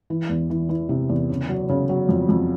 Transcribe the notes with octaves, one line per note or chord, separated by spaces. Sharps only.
E3
E2
E3
E3
C3
E2
C#3
F#3
C#3
F#3
F2
F2